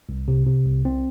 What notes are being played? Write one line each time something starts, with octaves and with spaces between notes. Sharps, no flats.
C2
C3
C3
C2
C4